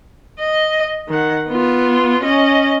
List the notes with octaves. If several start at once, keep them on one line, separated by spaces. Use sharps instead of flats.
D#5
D#3 F#5
B3 F4
C#4 D#5